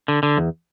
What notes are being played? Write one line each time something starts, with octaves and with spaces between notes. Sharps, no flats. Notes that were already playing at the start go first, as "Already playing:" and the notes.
D3
D3
E2